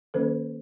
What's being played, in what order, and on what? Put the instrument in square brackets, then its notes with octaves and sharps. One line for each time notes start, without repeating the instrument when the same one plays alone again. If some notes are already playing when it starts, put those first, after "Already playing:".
[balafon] D#3 F#3 A#3 C#4 A4 C5